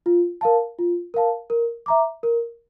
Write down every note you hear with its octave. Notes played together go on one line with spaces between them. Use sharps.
F4
A#4 F5 A5
F4
A#4 F5 A5
A#4
E5 A#5 D6
A#4